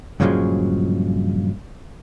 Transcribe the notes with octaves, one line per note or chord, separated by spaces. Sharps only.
G2 A#2 C#3 F3 F#3 G#3